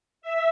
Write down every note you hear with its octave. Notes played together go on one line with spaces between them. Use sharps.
E5